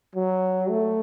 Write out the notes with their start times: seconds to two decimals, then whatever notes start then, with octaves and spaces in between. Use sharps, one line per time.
0.15 F#3
0.70 A3